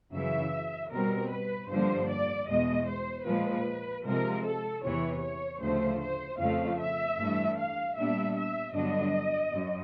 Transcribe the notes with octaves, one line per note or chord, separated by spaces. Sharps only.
F#2 C#3 E3 E5
B2 G3 C4 A#4
B4
G2 D3 F3 A#3 D4 C5
D5
E2 B2 G#3 D#5
C5
A#2 F3 G#3 B4
C3 F3 G#3 A#4
A4
E2 C3 E3 C#5
C#5
D2 C#3 F3 A3 C5
C5
F2 C#3 F3 A3 F5
E5
G2 E3 A3 D4
F5
A#2 G3 B3 D4 E5
E5
G2 D3 F#3 B3 D4 D#5
F#2